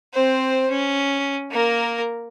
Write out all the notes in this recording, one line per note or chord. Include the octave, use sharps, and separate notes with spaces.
C4 C5
C#4
A#3 A#4